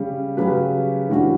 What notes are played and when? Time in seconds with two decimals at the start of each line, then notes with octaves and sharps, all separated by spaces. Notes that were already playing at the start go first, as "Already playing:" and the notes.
Already playing: C#3 G3 C#4
0.37 C#3 F#3 C#4 G4 B4
1.09 E3 G3 D4 F#4